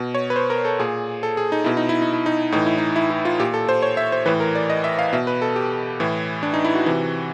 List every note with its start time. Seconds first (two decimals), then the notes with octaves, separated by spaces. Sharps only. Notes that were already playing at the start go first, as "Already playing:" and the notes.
Already playing: B2
0.15 C#5
0.30 B4
0.36 C5
0.50 A#4
0.65 A4
0.79 A#2 G#4
1.23 A4
1.37 G#4
1.52 D#4
1.64 B2 E4
1.77 D#4
1.89 E4
2.02 D#4
2.13 E4
2.26 D#4
2.52 A2 E3 D#4
2.66 E4
2.78 D#4
2.96 E4
3.10 E4
3.25 F4
3.39 A#2 G4
3.54 A4
3.69 C5
3.82 C#5
3.97 E5
4.12 C5
4.26 A2 E3 B4
4.40 A#4
4.55 D5
4.70 D#5
4.84 E5
4.99 F5
5.13 B2 E5
5.27 B4
5.42 A4
5.56 G4
6.00 A2 E3
6.43 D4
6.54 D#4
6.65 E4
6.75 F#4
6.86 C3 E3